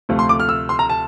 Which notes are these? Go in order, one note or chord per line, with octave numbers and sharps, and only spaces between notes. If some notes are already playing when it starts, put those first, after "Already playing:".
D2 C3 F3 A3
C6
D6
F6
E6
C6
A#5
A5